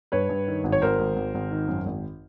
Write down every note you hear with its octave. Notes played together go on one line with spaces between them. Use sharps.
G2 B4 C#5
G2
D#3
G#1
C#5
G#1 A#4 C5
G#1
G#1
G#1
D#3
F#2
G#1